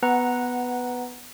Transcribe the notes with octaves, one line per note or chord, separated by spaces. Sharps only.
B3 B4 F#5 A#5